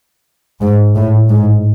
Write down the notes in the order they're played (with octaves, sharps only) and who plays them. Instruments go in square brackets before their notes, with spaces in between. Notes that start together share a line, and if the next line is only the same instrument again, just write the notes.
[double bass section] G#2
A2
G#2